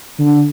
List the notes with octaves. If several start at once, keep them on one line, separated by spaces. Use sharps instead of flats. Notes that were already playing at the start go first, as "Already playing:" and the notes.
D3